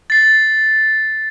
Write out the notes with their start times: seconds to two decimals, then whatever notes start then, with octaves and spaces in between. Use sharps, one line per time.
0.10 A6 C7